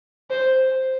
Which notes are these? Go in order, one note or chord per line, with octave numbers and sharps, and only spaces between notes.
C5